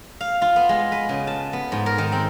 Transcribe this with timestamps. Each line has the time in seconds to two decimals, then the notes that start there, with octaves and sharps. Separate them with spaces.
0.21 F5
0.42 F4
0.56 B3
0.69 G#3
0.92 B4
1.09 C#3
1.27 A5
1.53 B3
1.72 G#2
1.86 A#4
1.98 D#3
2.12 C4